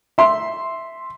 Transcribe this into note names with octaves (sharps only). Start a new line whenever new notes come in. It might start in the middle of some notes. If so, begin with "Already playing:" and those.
E5 C6